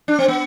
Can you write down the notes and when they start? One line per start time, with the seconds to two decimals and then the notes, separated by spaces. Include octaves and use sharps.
0.08 D4
0.19 C4
0.28 B3